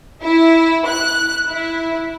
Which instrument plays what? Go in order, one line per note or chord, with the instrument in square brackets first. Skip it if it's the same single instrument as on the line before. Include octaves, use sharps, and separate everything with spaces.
[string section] E4
F#6
E4